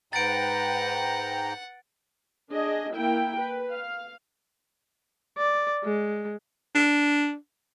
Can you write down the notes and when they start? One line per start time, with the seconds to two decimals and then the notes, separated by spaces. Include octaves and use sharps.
0.13 G#2 B4 F#5 G5 A#5 A6 D7
2.51 D4 G#4 D#5
2.93 A#3 E4 G5
3.37 B4
3.71 F5
5.37 D5
5.84 G#3
6.75 D4